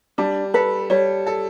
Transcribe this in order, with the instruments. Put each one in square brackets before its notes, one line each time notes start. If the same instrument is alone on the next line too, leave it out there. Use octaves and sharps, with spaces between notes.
[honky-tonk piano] G3 [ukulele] D4
[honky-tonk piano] A4 [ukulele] B4
[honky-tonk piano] G3 [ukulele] C#5
[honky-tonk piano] A4